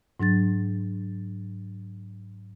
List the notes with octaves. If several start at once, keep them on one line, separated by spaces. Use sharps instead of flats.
G#2 F#3 D4 A6